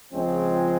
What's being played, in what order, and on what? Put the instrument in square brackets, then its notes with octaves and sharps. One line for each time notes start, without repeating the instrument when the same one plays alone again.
[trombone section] C#2 C#3 F3 G#3 C4 C#4